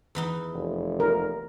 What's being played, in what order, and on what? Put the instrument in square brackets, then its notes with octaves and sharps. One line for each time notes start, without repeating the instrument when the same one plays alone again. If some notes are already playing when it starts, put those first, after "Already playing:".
[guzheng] E2 E3 D#4
[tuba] F1
[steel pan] A#4